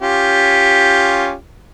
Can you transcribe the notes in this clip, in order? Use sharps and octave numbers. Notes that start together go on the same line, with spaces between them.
C#4 F4 G4